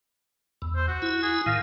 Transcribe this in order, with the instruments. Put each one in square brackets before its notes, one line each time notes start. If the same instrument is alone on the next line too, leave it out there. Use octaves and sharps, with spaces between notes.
[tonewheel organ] E2
[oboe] C5
F#4
[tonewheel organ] E4
[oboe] G#4
[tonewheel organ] A2 D#3 [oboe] F5